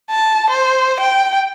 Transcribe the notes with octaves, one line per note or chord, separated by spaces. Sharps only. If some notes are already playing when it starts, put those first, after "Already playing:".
A5
C5
G5